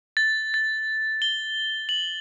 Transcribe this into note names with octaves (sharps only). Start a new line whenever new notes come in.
A6
A6
G7
F#7